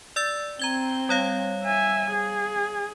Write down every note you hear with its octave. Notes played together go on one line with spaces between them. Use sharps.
D5 E6 A6
C4 A#5 G#6 G7
G3 C#5 F5
E5 G#5
G#4